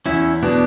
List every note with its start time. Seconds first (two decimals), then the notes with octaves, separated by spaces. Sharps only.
0.06 E2 C#4 E4
0.42 B2 B3 D4